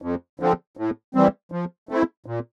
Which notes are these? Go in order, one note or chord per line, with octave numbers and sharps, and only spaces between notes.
F2
D3 F3 C4
A2
E3 G3 C4
F3
A3 C4 E4
A#2